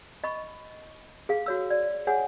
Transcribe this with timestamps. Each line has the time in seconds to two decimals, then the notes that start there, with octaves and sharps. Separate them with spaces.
0.24 D#5 B5 C#6
1.29 G#4 F5
1.46 F#4 C#5 E6
1.70 D5
2.07 G#4 C#5 F#5 G#5